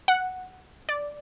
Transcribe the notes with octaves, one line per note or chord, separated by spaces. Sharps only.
F#5
D5